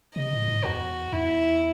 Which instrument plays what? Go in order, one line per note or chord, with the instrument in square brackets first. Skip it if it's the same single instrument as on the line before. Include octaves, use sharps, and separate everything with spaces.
[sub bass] C3 [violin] D#5
[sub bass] A2
G#2
[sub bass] E2 [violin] F#4
[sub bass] E2 [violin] E4